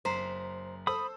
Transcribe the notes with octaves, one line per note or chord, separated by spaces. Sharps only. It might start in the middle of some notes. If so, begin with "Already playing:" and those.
F#1 C5 A#5 B6
A4 C5 B5 D#6 E6